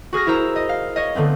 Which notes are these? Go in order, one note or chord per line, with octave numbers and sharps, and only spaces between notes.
F#4 G#4 F6 A#6
E4 A#4 C5 A#5 E6
D#5
F5
C#5 D#5
D3 A3 B3 C4